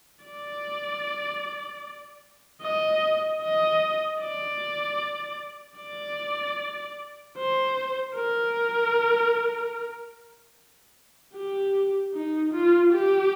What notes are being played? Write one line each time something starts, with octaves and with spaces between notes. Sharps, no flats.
D5
D#5
D#5
D5
D5
C5
A#4
G4
D#4
F4
G4